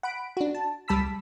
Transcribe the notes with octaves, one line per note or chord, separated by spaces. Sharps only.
F#5 B5 D7
D4 F#4
A5
C#2 G3 A5 B5 E6 B6